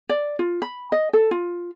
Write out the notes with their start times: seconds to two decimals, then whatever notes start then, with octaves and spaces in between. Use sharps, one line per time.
0.09 D5
0.39 F4
0.62 B5
0.92 D#5
1.13 A4
1.31 F4